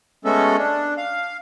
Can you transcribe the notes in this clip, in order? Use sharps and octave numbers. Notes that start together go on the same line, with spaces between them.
G#3 A3 B3 C#4 F#4 A4
D4
F5